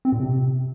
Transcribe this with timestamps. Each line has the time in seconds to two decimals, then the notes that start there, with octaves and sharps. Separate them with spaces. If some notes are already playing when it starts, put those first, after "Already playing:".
0.05 C4
0.12 A#2
0.20 C3